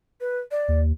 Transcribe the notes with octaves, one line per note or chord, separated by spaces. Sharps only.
B4
D5
D#2